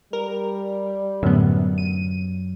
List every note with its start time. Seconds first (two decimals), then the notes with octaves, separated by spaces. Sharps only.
0.13 G3 A#4
1.23 F#2 A2 D3 B3
1.78 D#7